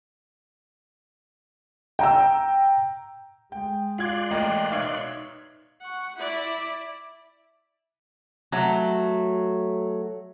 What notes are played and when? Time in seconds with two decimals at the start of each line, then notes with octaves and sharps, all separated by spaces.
1.99 G5 A#5 E6
3.52 G#3 G5
3.98 F4 D5 F5 C6 F#6 G#6
4.31 A1 A#3 A#4 D#5 G5
4.71 B2 D#4 C#5 E5 F5
5.81 F#5 C#6
6.17 E4 D5
8.52 F#3 A3